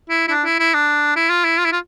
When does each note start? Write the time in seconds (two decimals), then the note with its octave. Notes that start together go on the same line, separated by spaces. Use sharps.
0.10 E4
0.28 E4
0.31 D4
0.45 E4
0.60 E4
0.74 D4
1.16 E4
1.30 F4
1.45 E4
1.58 F4
1.65 E4
1.72 F4